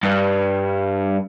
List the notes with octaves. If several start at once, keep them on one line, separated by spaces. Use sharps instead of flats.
G2